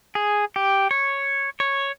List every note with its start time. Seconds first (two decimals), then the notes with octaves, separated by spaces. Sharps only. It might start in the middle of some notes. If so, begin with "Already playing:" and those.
0.15 G#4
0.56 G4
0.91 C#5
1.60 C#5